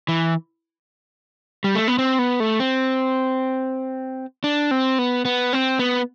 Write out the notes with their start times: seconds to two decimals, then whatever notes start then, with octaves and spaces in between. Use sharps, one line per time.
0.08 E3
1.64 G3
1.75 A3
1.88 B3
1.98 C4
2.19 B3
2.40 A3
2.60 C4
4.44 D4
4.71 C4
4.99 B3
5.25 B3
5.53 C4
5.79 B3